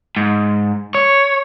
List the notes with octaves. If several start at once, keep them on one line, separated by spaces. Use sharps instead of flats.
G#2
C#5